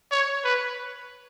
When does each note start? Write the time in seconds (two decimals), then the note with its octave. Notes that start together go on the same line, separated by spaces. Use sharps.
0.11 C#5
0.44 B4